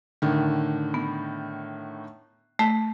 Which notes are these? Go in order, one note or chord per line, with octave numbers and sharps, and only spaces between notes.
A2 D3 D#3
B3
A3 B6